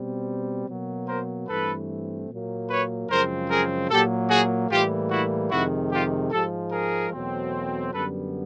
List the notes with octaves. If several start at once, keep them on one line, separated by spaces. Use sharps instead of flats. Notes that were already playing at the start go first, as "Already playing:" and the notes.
Already playing: B2 G3 C4
B2 F#3 A#3
A#4 C5
G2 E3 A3 C4 A4 B4
A#2 F#3 A#3
B4 C#5
F#2 C#3 F3 G#3 C4 A#4 C5
G#4 A#4
A#2 F#3 A#3 G4 A4
F#4 G#4
A2 E3 G3 A#3 F4 G4
E4 F#4
F2 C3 D#3 G#3 E4 F#4
F4 G4
G#2 F3 G#3 G4 A4
G#4 A#4
E2 B2 F#3 A3 C4
F#2 D3 G3 B3 A4 B4